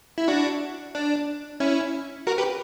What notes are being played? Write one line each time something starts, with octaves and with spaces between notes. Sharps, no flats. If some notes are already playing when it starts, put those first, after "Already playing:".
E4
D4 F#4
D4
C#4 E4
F#4 A#4
G4 B4